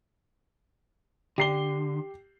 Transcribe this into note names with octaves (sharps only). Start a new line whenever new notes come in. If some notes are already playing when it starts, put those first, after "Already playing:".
D3 G4 C7 G7